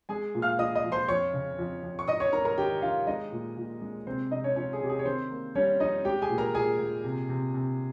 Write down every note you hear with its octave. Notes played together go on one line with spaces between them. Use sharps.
G#3 G#4 G#5
A#2
F5 F6
A#2 D#5 D#6
D#5 D#6
F3
C5 C6
F2 C#5 C#6
C#3
F2
F2
C#6
G#2 D#5 D#6
C#5 C#6
G#2 A#4 A#5
A#4 A#5
D#3 G4 G5
D#3 F4 F5
G#3 D#4 D#5
A#2
A#2
G#3
C3 C4 C5
C3 D#4 D#5
C#4 C#5
F3 C#4 C#5
G#4
C3 G4
G#4
C#5
D#3 C4 C5
A#3
G3 C#4 C#5
F2 D#4 D#5
G#3 G4 G5
G#4 G#5
A#2
A#4 A#5
A#2 G#4 G#5
A#2
C3
C3
C3